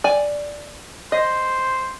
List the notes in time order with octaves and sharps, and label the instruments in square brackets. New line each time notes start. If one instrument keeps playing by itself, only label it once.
[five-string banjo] D5 G#5
[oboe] C5 [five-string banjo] D#5